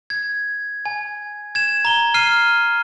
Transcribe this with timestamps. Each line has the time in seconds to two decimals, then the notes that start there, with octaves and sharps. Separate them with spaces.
0.10 G#6
0.85 G#5
1.55 G#6 E7
1.85 A#5 G7
2.14 F6 C7 D#7